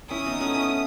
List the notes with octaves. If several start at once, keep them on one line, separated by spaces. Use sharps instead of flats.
C#4 E4 D#6
B3 D#4
A3 C#4
C#4 E4